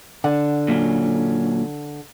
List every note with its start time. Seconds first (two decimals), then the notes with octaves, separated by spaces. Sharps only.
0.24 D3 F#5
0.68 A#2 F#3 C#4